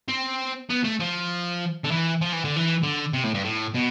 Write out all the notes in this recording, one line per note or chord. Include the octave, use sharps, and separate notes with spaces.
C4
B3
A3
F3
D3
E3
F3
E3
D3
E3
D3
C3
A2
G2
A2
B2